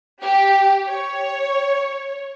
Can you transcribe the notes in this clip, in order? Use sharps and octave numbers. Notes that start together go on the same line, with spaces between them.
G4
C#5